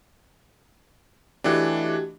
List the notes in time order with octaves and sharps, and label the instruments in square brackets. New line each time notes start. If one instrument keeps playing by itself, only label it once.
[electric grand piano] E3 A3 D4 [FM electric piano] F#4 G4 D#5